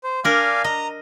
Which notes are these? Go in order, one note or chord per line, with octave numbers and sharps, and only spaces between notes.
C5
D4 A#4 D5 F5 G#5
D#5 A#5